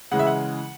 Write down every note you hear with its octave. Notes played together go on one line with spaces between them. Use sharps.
C#3 E3 G#3 F#5
E5
F#5